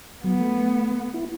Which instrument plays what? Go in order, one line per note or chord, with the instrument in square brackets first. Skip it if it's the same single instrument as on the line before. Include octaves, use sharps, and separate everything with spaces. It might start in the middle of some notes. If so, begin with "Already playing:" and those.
[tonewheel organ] F#3 [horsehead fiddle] B3
[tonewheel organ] A3
E4